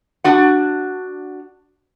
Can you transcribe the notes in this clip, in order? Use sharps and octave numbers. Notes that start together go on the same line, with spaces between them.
D4 F#4 F#5